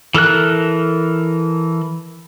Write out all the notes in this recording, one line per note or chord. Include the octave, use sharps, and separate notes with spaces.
E3 A4 A#4 F#6